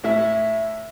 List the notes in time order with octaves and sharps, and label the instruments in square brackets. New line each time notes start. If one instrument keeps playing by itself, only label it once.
[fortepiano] A2 E4 E5